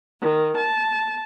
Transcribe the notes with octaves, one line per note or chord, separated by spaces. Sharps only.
D#3
A5